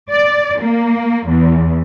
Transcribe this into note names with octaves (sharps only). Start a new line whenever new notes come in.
D5
A#3
E2